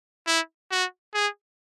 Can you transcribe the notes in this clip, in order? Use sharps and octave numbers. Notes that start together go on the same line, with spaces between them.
E4
F#4
G#4